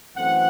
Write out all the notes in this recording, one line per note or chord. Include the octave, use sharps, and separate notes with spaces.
F#2 E3 A3 C4 F#5